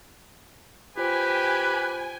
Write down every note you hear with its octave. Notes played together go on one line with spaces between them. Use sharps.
F4 G4 B4 C5 G5 G#5 D7